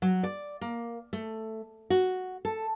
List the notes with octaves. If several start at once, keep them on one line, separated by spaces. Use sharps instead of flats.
F#3
D5
A#3
A3
F#4
A4